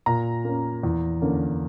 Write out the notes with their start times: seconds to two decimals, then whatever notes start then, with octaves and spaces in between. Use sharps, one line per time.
0.06 A#2 A#5
0.45 A#3 C#4
0.83 E2
1.22 D3 A#3 C#4